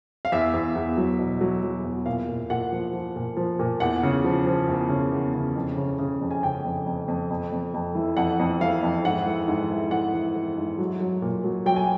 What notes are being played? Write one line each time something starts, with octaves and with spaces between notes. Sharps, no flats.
F5
E2 E5
E2
E2
F#3
B2
F#3
F#3
E2
A#2 F5
A#2
A#2 F#5
F3
F3
A#2
F3
A#2
E2 F#5
C#3
F3
F3
E2
C#3
E2
C#3
F2
C#3
C#3
F2
G#5
C#3 G5
F2
F2
F2
F2
F2
F2
E3
F2 F#5
F2
E3 F5
F2
G#2 F#5
E3
G#2
E3
E3 F#5
E3
E3
G#2
F#3
F#3
A#2
F#3
F#3 G5
G#5